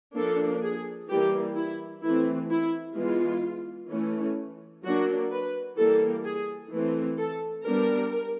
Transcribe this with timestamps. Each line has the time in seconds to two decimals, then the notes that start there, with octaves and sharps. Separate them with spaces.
0.16 F3 A#3 D4 A4
0.62 G#4
1.10 E3 G3 A#3 G4
1.56 E4
2.03 E3 A3 C4 E4
2.51 E4
2.96 E3 G#3 B3 F4
3.90 E3 A3 C#4
4.84 F#3 A#3 D4 F#4
5.31 B4
5.77 E3 G3 A#3 A4
6.25 G#4
6.71 E3 A3 C4
7.18 A4
7.65 G3 B3 D4 A#4